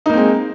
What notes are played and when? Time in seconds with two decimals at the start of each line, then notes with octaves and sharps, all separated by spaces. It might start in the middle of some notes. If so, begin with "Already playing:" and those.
0.06 D#4
0.10 A#3
0.13 C4
0.17 G#3